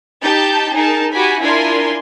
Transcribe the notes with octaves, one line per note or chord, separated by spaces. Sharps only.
D#4 G4 A5 G6 A6
D#4 G#4 A#4 A5
F#4 G4 G#5 B5
D4 E4 F4 A#4 G#5 C6